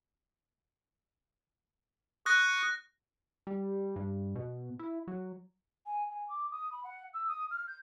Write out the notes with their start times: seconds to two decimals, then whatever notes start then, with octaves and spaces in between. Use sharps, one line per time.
2.26 C#6 D#6 F#6 A#6
3.47 G3
3.96 G2
4.36 B2
4.79 E4
5.08 F#3
5.86 G#5
6.10 G#5
6.28 D6
6.51 D#6
6.72 B5
6.84 F#5
7.13 E6
7.27 D#6
7.50 F6
7.67 G6